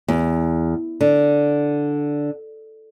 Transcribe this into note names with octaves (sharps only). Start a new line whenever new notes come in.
E2
D3